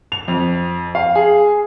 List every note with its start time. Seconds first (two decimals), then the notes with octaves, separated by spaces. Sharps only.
0.12 F7
0.28 F2
0.95 F5
1.15 G#4